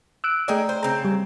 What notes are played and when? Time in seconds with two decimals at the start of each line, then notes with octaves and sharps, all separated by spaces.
0.24 E6 F#6 D7
0.48 A3 D#4 G#4 D5 G5
0.69 C5
0.83 C#3 C4 A#5
1.05 G3